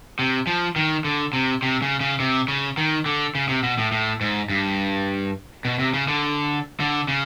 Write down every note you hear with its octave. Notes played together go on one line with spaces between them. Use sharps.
C3
F3
D#3
D3
C3
C3
C#3
C#3
C3
C#3
D#3
D3
C#3
C3
B2
A2
A2
G#2
G2
B2
C3
C#3
D3
D3
C#3